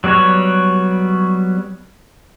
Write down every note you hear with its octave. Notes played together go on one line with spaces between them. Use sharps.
F#3 G3 B3 F#4 C#5